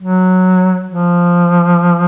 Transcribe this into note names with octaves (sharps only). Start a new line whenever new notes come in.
F#3
F3